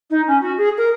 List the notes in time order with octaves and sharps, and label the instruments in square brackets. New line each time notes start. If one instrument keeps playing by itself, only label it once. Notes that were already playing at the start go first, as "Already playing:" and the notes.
[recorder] D#4
C#4
F#4
G#4
A#4